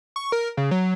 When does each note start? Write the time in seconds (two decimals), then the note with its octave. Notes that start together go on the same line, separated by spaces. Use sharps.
0.16 C#6
0.32 A#4
0.57 C#3
0.71 F#3